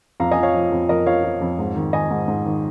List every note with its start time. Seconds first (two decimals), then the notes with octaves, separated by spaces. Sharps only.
0.20 F2 F5 A#5
0.31 D#5 G#5
0.37 F3
0.43 C#5 F5
0.54 F3
0.72 F2
0.89 F2 A#4 D#5
1.06 F3 C#5 F5
1.24 F3
1.41 F2
1.59 G#2
1.76 D#3
1.93 D#3 D#5 G#5
2.10 G#2
2.28 G#2
2.45 D#3